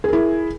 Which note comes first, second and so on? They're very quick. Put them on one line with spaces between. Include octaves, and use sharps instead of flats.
G#4 A#4 E4